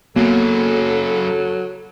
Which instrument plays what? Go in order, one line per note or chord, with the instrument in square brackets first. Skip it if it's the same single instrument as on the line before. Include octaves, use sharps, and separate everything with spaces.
[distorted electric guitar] F#2 C#3 [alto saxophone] F#3 [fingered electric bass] A#3 B3 [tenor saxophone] A4